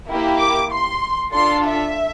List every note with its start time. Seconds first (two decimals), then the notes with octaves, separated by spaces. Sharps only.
0.08 A#3 E4 G4
0.39 D6
0.71 C6
1.33 D4 F4 A4 C6
1.66 E5